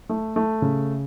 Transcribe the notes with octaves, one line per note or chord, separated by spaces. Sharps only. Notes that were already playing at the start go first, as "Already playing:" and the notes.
A3
A3
C#3